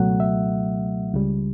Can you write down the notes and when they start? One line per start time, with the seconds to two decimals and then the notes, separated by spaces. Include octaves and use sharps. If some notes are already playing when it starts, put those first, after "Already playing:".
Already playing: C#2 B2 F#3 A3 F#5
0.20 E5
1.14 C#2 C#3 G3